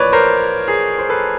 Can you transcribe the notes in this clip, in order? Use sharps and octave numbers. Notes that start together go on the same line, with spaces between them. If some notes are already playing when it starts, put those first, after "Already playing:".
Already playing: A1 A2 F3 A#3 B4 C#5 D5
A#4 C5
G#4 A#4
C5
A4 B4